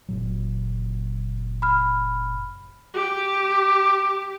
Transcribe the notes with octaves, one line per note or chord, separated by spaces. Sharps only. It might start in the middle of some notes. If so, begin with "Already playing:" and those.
F#1 A#2 F#3
B5 F6
G4